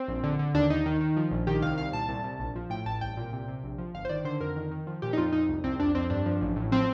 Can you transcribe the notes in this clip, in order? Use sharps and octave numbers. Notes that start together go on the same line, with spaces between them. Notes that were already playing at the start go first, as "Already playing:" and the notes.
Already playing: C4
A#1
D3
D3
D#2 D4
D#2 D#4
D#3
D#3
F3
A#1
D#3 G4
C2 F5
C2 F5
A#2 A5
C2
C2
A#1
F3
A2 G5
A1 A5
C2 G5
A#2
C3
C3
A#1
F3
G1 F5
C5
D#3 D5
D3 C5
F2 A#4
D#3
D#3
F3
A#2 G4
D#4
F2 F4
F2 D#4
C2
C2 C4
F2 D4
F2 C4
G2 D4
F3
A1
A2
F3 C4